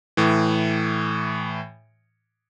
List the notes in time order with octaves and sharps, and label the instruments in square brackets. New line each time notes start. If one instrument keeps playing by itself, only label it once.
[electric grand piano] A2 E3